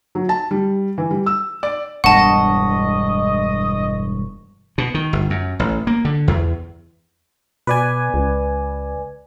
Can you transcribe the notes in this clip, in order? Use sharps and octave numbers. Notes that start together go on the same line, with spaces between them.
F#3
A5
G3
E3
G3
E6
D5
E1 G2 G#3 D#5 F#5 A5 C#6
B2
D#3
G1
F#2
A1
A#3
D3
E2
B2 B4 D5 G#5
C#2